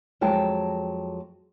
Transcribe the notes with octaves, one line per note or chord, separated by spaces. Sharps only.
F2 F#3 G#3 G5 A5